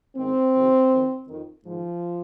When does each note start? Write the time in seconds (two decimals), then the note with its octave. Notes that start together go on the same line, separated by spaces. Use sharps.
0.16 G#2 D#3 C4
0.53 F2 C3 D#3
0.91 F2 D#3
1.28 F2 D#3
1.64 G#2 D#3 F3